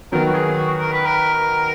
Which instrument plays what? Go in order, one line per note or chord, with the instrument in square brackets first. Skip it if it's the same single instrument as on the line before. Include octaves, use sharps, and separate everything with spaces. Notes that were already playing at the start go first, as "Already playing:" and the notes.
[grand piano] D#3 F#3 B3 [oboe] A#4
[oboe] F#4
G#4
F#4
A#4
B4
A#4